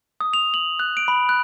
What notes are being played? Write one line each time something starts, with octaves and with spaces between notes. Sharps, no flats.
D#6
F7
F#7
F#6
D7
B5
F#6